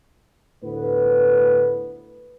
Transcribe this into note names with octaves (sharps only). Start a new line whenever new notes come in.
D2 A2 B3 B4